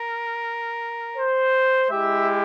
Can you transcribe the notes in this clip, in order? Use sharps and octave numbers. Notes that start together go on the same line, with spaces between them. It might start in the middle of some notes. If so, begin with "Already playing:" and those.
Already playing: A#4
C5
G#3 E4 G4 E5